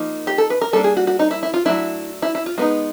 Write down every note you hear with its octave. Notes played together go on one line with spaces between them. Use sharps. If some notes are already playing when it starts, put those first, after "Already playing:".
Already playing: F3 A#3 D#4
G4
A4
B4
A#4
G3 A#3 D4 A4
G#4
F#4
F#4
D#4
E4
E4
F4
F#3 A3 D4 E4
E4
E4
F4
G#3 B3 D#4 F#4